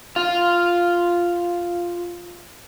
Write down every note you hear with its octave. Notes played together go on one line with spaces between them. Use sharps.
F4 F5